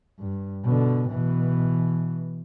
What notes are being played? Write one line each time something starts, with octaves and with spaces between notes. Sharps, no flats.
G2
B2 D3
B2 E3